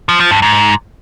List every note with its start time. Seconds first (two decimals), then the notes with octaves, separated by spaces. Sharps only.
0.09 F3
0.20 F3
0.31 G2
0.42 G#2